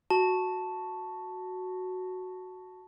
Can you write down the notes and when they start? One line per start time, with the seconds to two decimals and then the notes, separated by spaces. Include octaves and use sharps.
0.10 F#4 A5